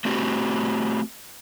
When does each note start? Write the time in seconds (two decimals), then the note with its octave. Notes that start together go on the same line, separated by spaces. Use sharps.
0.05 A3 C4 F#4 G4